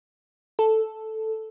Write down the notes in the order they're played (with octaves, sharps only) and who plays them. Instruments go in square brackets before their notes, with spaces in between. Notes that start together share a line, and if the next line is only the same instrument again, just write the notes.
[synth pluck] A4